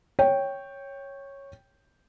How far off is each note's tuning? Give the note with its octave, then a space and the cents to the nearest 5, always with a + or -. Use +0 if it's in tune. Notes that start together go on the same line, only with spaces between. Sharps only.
C#5 -5 G5 +0